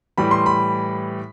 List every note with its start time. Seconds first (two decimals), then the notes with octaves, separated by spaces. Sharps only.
0.18 A2 E3 G3 B5
0.31 C6
0.46 B5